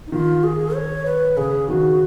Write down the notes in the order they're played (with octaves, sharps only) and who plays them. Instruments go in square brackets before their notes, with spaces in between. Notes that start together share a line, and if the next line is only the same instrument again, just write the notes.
[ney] D#4
[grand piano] D#3 [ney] F4
[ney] G#4
C#5
B4
[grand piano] C#3 [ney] G#4
[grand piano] D#3 [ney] F#4